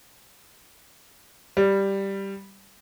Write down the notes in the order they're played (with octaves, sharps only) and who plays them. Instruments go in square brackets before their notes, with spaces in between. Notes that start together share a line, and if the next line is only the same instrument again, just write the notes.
[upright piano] G3